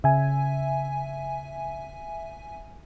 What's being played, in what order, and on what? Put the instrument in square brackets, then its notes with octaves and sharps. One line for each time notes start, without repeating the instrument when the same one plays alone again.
[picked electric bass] C#3 [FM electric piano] E5 G#5